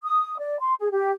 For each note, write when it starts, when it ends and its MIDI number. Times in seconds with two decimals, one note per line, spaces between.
0.03 0.38 87
0.39 0.57 74
0.60 0.74 84
0.80 0.89 68
0.91 1.11 67